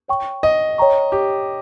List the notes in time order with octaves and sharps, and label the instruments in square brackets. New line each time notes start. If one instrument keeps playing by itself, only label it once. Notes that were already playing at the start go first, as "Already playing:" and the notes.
[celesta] C#5 G5 C#6
[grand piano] D#5
[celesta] C#5 G5 A#5 C#6
[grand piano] G4